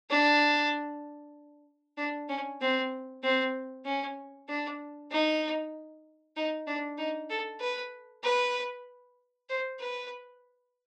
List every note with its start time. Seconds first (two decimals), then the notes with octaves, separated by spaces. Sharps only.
0.11 D4
1.98 D4
2.29 C#4
2.61 C4
3.24 C4
3.86 C#4
4.48 D4
5.12 D#4
6.37 D#4
6.67 D4
6.98 D#4
7.30 A4
7.61 B4
8.24 B4
9.50 C5
9.80 B4